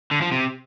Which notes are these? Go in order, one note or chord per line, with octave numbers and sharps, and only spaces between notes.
D3
F3
C3